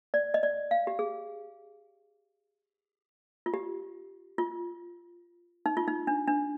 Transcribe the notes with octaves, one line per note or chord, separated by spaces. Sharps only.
D5
D#5
D5
F5
G4
G#4
F4
G4
F4
D#4
F4
D#4
D4
D4